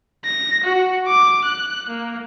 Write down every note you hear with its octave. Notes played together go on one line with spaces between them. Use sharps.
A#6
F#4
D6
F#6
A#3